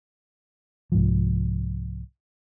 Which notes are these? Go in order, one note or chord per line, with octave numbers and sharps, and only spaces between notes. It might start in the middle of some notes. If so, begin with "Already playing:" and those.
C2 G#2 F3